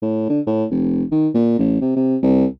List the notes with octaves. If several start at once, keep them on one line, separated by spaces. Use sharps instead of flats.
A2
D3
A2
F1
D#3
A#2
A1
C3
C3
C2